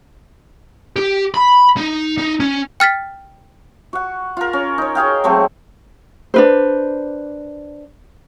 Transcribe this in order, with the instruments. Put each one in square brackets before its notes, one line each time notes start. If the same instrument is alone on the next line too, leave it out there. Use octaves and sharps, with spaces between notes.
[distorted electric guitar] G4
B5
D#4
D#4
C#4
[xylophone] G5 F6 A6 B6
[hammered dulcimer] F#4 F#5
F4 A#4
C#4
D#4 C#5
F#4 G#4 F5 G5
F#3 G#3 A3 C4
[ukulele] D4 B4 C5